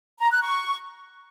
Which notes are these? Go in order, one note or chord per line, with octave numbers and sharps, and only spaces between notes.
A#5
F#6
C#6